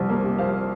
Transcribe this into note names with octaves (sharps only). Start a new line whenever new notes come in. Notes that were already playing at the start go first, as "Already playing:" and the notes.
Already playing: C2 C3 F3
A#3
C3
F3 C5 F5